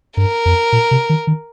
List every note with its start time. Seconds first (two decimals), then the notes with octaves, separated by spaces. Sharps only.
0.17 G2 A#4
0.46 F2
0.72 A#2
0.91 C3
1.09 D#3
1.27 D#3